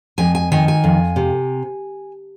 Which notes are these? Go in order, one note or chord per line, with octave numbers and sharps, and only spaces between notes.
F2 G#5
G#5
D#3 G#5
G#5
F2
C3